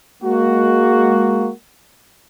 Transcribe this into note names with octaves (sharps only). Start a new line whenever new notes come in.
G#3 A#3 F#4